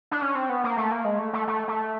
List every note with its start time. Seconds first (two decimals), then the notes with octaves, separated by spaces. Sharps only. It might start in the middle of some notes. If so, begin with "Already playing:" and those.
0.11 D4
0.22 C#4
0.35 C4
0.49 B3
0.64 A#3
0.77 A3
0.92 A#3
1.05 G#3
1.19 A3
1.33 A3
1.47 A3
1.68 A3